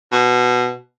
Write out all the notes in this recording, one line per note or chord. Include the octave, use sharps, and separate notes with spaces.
B2